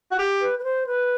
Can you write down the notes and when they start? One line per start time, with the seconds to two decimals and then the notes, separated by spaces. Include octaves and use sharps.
0.11 F#4
0.19 G4
0.41 B4
0.59 B4
0.64 C5
0.87 B4